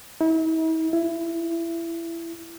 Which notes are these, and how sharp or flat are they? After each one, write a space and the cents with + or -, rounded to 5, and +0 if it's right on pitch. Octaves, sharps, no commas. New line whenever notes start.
E4 -45
E4 +20